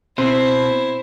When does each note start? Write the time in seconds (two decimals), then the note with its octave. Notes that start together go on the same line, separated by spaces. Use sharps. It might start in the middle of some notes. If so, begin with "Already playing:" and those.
0.18 B2 C4 E4 C5